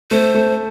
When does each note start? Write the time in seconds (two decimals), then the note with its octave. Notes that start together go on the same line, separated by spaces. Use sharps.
0.11 A3 C5
0.35 A3